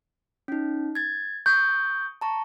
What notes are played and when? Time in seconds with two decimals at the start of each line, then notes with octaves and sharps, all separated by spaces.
0.48 C#4 D#4
0.95 G#6 A6
1.46 C#6 D#6 G6 D7
2.21 A5 A#5 C#6